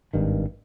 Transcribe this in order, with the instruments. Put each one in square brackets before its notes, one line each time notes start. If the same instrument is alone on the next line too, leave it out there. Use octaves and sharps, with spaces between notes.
[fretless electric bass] G#1 G2 D#3